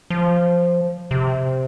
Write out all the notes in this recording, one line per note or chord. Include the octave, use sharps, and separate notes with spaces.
F3
C3